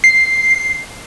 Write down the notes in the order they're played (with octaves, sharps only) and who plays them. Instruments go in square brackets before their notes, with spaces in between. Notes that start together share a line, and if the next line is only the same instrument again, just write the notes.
[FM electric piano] C7